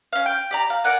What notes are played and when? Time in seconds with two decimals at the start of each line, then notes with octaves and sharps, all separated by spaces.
0.13 C#4 F5
0.26 G5
0.51 G4 D5 A#5
0.70 F5
0.84 A#4 D5 F#5 G#5